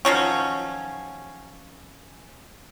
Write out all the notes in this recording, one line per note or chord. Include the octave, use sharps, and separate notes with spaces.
D#3 F3 F#3 C#4